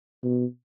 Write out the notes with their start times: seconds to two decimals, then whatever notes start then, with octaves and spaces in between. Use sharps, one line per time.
0.24 B2